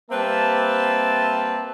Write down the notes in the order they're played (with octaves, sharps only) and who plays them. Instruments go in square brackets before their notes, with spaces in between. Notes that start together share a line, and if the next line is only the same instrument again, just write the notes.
[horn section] G3 A#3 C4 B4 E5 A5